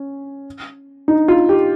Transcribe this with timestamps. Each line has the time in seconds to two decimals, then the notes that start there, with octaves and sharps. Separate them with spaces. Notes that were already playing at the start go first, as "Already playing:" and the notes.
Already playing: C#4
1.08 D#4
1.28 F4
1.49 G4